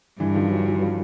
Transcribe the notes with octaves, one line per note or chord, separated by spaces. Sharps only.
G2 D3 E3
D#3 F3
E3 F#3
E3 F#3
F3 G3